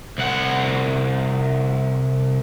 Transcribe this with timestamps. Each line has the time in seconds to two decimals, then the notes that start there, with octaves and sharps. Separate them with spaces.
0.18 C2 F#5